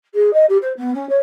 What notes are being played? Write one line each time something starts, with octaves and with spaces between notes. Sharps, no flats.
G#4
D#5
G4
C5
B3
C#4
C#5